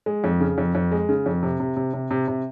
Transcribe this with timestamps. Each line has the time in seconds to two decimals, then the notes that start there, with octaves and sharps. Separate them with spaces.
0.06 G#3
0.24 F2
0.40 C#3
0.58 F2
0.75 F2
0.92 G#3
1.09 C#3
1.26 F2
1.43 C3
1.60 C3
1.77 C3
1.93 C3
2.11 C3
2.28 C3